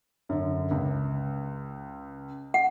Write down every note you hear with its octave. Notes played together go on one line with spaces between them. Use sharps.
F#2 D3
C#2
F#5